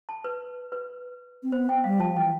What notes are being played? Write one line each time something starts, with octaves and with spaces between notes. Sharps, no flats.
A5
B4
B4
C4
B3 C5
G5
G3 F5
F3 A5
E3 G5